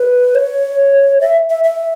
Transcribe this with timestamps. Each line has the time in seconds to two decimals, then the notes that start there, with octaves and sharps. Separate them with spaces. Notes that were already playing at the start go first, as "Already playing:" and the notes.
Already playing: B4
0.35 C#5
1.21 E5
1.50 E5
1.64 E5